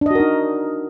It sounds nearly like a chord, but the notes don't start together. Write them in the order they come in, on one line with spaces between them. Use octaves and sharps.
D4 D#5 F#4 A#4 D#4